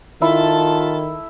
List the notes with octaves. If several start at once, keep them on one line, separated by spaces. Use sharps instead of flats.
D#3 E4 F4 A4 A5